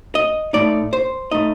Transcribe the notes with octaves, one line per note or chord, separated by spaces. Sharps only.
D#5
A2 A3 D#4 D5
C5
A2 A3 D#4 D#5